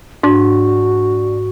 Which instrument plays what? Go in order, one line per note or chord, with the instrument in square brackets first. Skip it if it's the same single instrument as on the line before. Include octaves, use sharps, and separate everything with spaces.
[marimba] G#2 [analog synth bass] D4 [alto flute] F#4